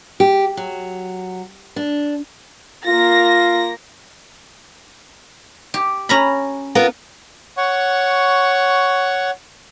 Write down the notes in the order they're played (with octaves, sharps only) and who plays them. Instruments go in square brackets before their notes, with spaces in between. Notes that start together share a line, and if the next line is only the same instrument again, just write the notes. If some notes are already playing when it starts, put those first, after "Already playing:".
[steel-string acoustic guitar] G4
F#3
D4
[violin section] A#3 A#6 [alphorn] F4
[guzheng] G4
C#4 A#5 B5
[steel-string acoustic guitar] B3 F4 A#4
[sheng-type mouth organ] C#5 F#5 C#6